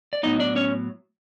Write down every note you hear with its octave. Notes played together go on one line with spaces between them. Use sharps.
D5
A2 F#3 B3 D#4 D#5
D4 D5
C#4 C#5